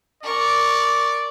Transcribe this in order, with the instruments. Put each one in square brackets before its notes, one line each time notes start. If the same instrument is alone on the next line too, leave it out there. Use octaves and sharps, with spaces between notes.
[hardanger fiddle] A#4 C#6 [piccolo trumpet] D5